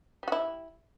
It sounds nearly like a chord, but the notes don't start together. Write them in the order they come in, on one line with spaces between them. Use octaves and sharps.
G3 F#4 E4